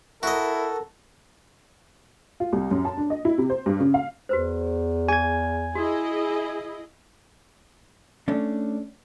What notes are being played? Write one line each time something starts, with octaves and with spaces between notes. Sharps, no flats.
E4 F#4 A4 A#4 D#5
F4
C2
F#2
A5
D4
D#5
E4
C3
C5
G2
C#3
F5
E2 F#4 B4 C5
G#4 G#5 G#6
E4 F#4 G#4 D#5
A3 C#4 D4